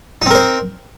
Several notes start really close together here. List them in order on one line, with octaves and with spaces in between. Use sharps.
D#4 C4 A#4 C5